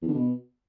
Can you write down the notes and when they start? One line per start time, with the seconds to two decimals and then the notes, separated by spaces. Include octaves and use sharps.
0.02 E2
0.08 D3
0.15 B2